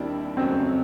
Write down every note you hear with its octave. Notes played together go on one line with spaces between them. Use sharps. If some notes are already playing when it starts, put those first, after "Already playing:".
Already playing: D#2 D#3 G3 C4 D4 E4
F2 C#3 F#3 A3 C4